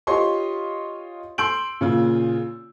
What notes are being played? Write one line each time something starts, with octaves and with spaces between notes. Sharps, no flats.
F4 G4 C#5 D#5 C6 C#6
C6 E6 G6 D7 F#7
A#2 C#3 F4